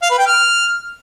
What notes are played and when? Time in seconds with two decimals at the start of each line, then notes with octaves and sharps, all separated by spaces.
0.02 F5
0.11 B4
0.19 G5
0.27 F6